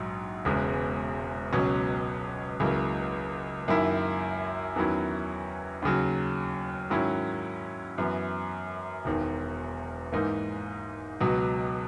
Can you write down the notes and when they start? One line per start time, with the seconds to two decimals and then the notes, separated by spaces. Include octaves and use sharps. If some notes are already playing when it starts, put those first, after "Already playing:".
Already playing: A#1 G#2 F#3
0.45 E1 E2 C#3 G#3 B3
1.53 C#2 B2 F#3 C#4
2.60 C#2 C#3 F#3 A#3 E4
3.68 F#2 D#3 A#3 E4
4.76 E2 D#3 F#3 C#4 E4
5.82 D#2 C#3 F#3
6.90 G#2 D#3 F#3 C#4 E4
7.98 F#2 E3 B3
9.05 E1 E2 D#3
10.12 G#2 E3 A#3 D#4
11.20 C#2 B2 F#3